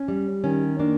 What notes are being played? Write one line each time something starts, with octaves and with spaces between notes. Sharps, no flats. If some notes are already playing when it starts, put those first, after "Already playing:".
Already playing: C#4
G3
D#3 C#4
A#3 D4